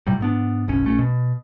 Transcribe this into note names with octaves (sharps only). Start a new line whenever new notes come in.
A2 C3 F#3 G3
G#2 B3 D4
F#1 B1 C#4
A#1 A3 C#4
B2